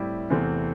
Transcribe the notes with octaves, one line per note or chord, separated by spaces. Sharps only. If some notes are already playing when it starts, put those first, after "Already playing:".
Already playing: A2 G3 C4 E4 G4
E2 C3 E3 A3 C4